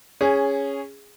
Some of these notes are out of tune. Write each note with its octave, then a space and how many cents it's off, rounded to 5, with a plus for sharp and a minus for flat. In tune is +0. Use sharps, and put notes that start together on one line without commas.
C#4 +0 G#4 -10